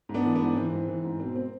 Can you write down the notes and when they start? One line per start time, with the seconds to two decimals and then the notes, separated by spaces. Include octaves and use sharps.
0.09 G#2
0.14 B3 D4
0.25 E3
0.35 B3 D4
0.42 G#2
0.57 E3 C4
0.72 G#2
0.88 E3
1.04 G#2
1.20 B2 C4
1.36 C4